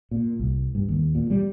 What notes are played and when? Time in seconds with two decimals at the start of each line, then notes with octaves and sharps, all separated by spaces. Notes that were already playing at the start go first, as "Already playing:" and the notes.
0.11 A#2
0.39 C2
0.75 G2
0.89 D#2
1.15 A#2
1.30 G3